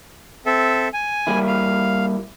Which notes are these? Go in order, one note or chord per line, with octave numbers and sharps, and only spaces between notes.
C4 A4 E5
G#5
G3 A#3 E4
F5